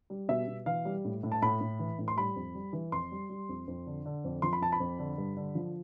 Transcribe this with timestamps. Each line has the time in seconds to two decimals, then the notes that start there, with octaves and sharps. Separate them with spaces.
0.10 G3
0.28 B2 E5
0.47 B2
0.66 E3 F5
0.85 G3
1.05 A2
1.23 A2
1.32 A5
1.42 A2 B5
1.61 A2
1.79 E3
1.99 A2
2.08 C6
2.16 G3 B5
2.36 F2
2.55 G3
2.73 E3
2.92 F2 C6
3.12 G3
3.30 G3
3.49 F2
3.67 F2
3.86 D3
4.06 D3
4.24 F2
4.42 F3 C6
4.53 B5
4.61 F2 A5
4.72 B5
4.80 F2
4.99 D3
5.18 G2
5.37 D3
5.55 F3